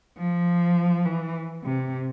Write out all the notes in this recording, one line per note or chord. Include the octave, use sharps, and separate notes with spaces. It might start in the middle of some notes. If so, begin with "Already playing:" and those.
F3
E3
C3